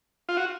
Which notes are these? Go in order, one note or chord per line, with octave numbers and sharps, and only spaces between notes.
F4
F#4